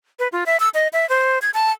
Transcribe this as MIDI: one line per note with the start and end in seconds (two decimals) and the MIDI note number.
0.19 0.28 71
0.32 0.44 65
0.46 0.59 76
0.60 0.69 88
0.74 0.88 75
0.93 1.08 76
1.09 1.39 72
1.42 1.50 92
1.54 1.72 81